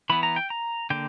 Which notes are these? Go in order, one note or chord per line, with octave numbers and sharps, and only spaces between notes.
E3 B3 B5
A#5
G5
A#5
D3 A#3 G5